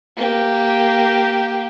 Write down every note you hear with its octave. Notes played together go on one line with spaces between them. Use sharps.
A#3 G4